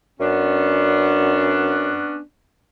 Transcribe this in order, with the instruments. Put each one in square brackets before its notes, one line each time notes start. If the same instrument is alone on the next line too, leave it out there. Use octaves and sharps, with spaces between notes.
[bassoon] F#2 [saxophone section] B3 C#4 D4